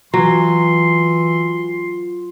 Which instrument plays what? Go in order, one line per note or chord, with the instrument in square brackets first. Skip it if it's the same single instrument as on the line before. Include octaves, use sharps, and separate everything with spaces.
[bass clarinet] E3 [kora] F#3 [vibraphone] F4 [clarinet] C6